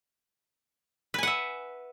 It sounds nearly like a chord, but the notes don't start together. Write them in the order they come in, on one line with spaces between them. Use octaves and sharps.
B4 G#5 F#5 E5